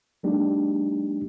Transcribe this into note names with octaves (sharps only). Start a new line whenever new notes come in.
F#3 G#3 A#3 D4 D#4 G4